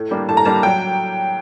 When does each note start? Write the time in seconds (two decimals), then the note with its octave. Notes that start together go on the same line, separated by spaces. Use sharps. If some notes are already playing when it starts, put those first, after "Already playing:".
Already playing: A2
0.11 G3 A#3 D4
0.28 A2 A5
0.37 A#5
0.45 G3 A#3 D4 A5
0.63 F#3 G5